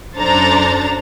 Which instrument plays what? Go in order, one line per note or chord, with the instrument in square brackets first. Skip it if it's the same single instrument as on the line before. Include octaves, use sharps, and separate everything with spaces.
[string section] F#2 D4 A4 C5 A#5 A6